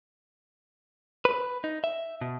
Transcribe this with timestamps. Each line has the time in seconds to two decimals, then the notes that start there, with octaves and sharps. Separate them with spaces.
1.25 B4
1.64 D#4
1.84 E5
2.21 B2